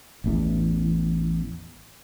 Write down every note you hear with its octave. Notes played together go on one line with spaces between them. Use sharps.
A1 E2